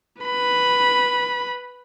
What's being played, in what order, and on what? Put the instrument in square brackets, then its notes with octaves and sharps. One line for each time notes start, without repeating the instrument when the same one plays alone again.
[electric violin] B4 B5